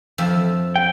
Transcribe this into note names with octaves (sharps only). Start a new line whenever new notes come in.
F2 F3 E5
G5